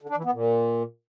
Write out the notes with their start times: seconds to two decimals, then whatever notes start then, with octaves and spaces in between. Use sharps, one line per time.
0.01 D3
0.09 D4
0.17 E3
0.25 B3
0.32 A#2